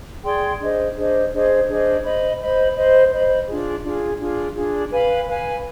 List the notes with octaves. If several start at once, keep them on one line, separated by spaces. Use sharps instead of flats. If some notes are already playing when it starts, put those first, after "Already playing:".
G#4 D5 G5 C6
D4 G#4 C5 D#5
D4 G#4 C5 D#5
D4 G#4 C5 D#5
D4 G#4 C5 D#5
C5 D#5 B5
C5 D#5 B5
C5 D#5 B5
C5 D#5 B5
D4 F4 G#4
D4 F4 G#4
D4 F4 G#4
D4 F4 G#4
B4 F5 G#5 B5
B4 F5 G#5 B5